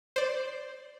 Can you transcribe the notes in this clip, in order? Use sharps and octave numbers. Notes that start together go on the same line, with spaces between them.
C5 D5